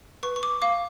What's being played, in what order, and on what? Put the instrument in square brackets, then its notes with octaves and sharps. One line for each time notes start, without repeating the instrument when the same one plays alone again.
[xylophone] B4 C#6
C#6
D6
F5 D6